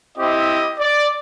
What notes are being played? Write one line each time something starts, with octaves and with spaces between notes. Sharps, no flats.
C4 E4 G4 D#5
D5